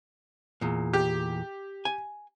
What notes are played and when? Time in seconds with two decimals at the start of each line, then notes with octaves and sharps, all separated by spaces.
0.61 E2 A#2
0.93 G4
1.85 G#5